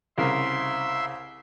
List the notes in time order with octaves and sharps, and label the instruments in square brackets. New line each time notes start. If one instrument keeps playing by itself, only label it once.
[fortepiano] C2 C#3 A#4 [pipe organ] E5 C6